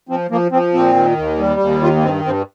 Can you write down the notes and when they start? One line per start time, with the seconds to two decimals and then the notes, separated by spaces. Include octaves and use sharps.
0.09 F3 C4
0.30 F3 A#3
0.52 F3 C4
0.74 A#2 C4
0.95 D#3
1.17 D#2
1.39 G3
1.60 D#2
1.82 D#3 F4
1.96 A#3
2.03 G2 C4
2.25 G2 C4